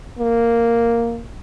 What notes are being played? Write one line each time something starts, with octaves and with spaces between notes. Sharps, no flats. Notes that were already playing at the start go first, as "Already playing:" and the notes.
A#3